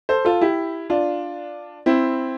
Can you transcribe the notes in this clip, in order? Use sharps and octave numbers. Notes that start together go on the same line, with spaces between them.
A4 C5
F4 A4
E4 G4
D4 F4
C4 E4